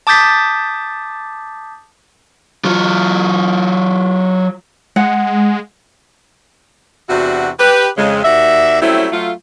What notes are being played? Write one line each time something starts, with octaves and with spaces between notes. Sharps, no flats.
A5 D6 D#6 G6 A6 B6
F#3 F4
G#3 F#5
E2 C3 D4 E4 F#4
G4 B4
F2 C#3 G#3
D#2 F#4 D5 E5
F#3 G3 A3 C4 C#4 E4
F#3 A3 F4